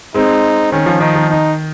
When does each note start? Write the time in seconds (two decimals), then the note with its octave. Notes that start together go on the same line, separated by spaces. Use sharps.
0.14 G#3 C4 D#4
0.72 D#3 C#4
0.86 F3
1.00 D#3 D#4
1.15 D#3
1.30 D#4